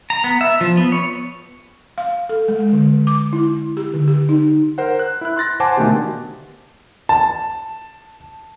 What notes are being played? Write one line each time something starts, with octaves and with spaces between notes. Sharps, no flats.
A#5
B3
E5
F3
B3
C#5
F5
A4
G#3
D3
D6
E4
G4
D3
G4
D#4
A#4 C5 F#5
F#6
E4 F#6
C6 F#6 A6 A#6
C5 F#5 G#5 A5 C6 D6
B2 D3 D#3 A3 A#3 G4
A5